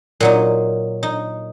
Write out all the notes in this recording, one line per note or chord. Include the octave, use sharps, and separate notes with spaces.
A#2 F#3 D#4
D#4